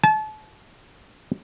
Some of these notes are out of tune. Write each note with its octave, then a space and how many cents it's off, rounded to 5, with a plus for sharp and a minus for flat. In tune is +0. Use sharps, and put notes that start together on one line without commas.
A5 -30